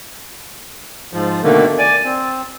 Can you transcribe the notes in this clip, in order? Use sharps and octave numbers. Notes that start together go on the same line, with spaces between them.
G#2 F3
B2 D3 D#3 A3 A#3
D5 G#5
C4